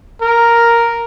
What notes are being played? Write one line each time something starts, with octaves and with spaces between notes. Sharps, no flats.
A#4